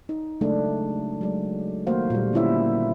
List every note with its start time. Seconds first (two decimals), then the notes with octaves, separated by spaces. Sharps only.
0.09 D#4
0.41 C#3 F#3 G#3 A3 D4
1.21 F#3 G#3 D5
1.87 D#3 A3 A#3 F#4 C5 F5
2.10 A#2 G3
2.33 D3 B3 C#4 E4 C5 E5